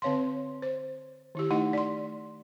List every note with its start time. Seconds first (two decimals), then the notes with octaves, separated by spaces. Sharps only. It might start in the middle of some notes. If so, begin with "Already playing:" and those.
0.02 D3 C4 C#5 F5 C6
0.62 C5
1.35 D#3 E4 G4
1.50 A3 D#4 E4 D#5 F#5
1.73 D5 C6